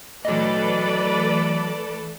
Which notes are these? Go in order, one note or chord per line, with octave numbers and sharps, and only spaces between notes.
E3 F#3 A3 A4 B4 D5 D#5